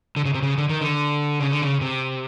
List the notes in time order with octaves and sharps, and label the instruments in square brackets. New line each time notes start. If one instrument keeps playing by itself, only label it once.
[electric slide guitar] D3
C#3
C3
C#3
D3
D#3
D3
C#3
D3
C#3
C3